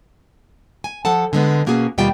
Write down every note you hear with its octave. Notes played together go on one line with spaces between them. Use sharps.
G#5
F3 A4 F#5 A5
D3 G#3 B3
B2 A#3 C#4 F#4 G#4
D#2 B2 G3 F4 G5